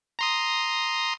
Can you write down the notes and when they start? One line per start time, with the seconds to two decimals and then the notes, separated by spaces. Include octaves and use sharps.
0.19 A#5 C6 D#6